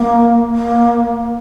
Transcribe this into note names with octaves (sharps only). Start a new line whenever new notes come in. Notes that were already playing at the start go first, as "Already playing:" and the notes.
Already playing: A#3
A#3